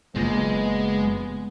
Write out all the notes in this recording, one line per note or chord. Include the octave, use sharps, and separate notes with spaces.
F#1 F#2 A#2 G#3 B3